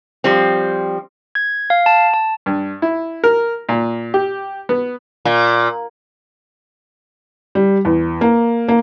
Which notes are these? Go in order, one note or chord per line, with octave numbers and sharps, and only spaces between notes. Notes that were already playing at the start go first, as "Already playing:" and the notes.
F3 G3 C4
G#6
F5
A5
A5
G2
E4
A#4
A#2
G4
B3
A#2
G3
E2
A#3
A#3